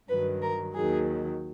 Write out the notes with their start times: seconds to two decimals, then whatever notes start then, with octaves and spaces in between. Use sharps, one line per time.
0.09 G2 D#3 F#3 B4
0.42 A#4
0.75 D#2 D#3 F#3 G#4